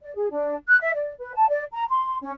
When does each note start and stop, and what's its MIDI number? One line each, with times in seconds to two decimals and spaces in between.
0.02 0.12 74
0.15 0.27 68
0.32 0.55 62
0.68 0.77 90
0.82 0.91 76
0.95 1.13 74
1.19 1.32 71
1.35 1.48 81
1.49 1.64 74
1.73 1.84 82
1.89 2.17 84
2.22 2.30 61